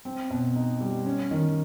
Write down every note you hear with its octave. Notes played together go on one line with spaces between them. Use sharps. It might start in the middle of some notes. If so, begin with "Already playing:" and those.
C4
B2
D#4
G3
C#4
D#3